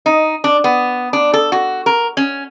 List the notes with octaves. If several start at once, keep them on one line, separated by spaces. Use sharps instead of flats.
D#4
D4
B3
D4
A4
F#4
A#4
C#4